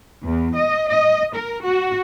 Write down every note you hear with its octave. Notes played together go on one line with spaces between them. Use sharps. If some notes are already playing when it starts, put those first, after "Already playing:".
E2
D#5
D#5
A#4
F#4